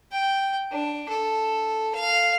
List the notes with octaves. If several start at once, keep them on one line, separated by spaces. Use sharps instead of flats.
G5
D4
A4
F5